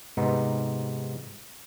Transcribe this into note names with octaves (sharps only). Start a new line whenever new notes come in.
G#2 C3 B3 D#4